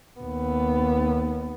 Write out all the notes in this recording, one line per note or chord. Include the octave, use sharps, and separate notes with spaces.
D#2 B3